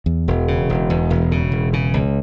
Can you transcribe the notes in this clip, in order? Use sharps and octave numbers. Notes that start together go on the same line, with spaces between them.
E2
E1
C#3
E1
E2
E1
C#3
E1
C#3
C#2